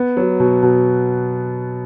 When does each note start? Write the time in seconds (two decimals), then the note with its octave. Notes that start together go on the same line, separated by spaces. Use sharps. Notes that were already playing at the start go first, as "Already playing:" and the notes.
Already playing: B3
0.17 F#3
0.40 B2
0.62 B2